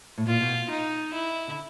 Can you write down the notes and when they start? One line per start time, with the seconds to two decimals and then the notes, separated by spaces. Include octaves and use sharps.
0.18 A2
0.27 A#2 F4
0.41 B2
0.69 D#4
1.13 E4
1.48 D3